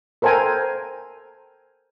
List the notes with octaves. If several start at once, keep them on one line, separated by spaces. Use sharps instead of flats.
A4 A#4 C5 G5 G#5